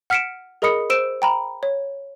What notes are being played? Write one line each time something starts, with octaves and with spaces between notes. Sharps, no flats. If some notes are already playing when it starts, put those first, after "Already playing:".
F#5 F6 B6 C#7 D7 E7
G#4 A#4 D#5 B5 D#6 C#7
C5 E6 D7 E7
G5 A#5 B5
C#5